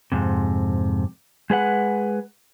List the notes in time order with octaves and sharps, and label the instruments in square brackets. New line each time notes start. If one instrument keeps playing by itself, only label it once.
[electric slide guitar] F2 G#2 C3
G#3 G#4 B4 F#5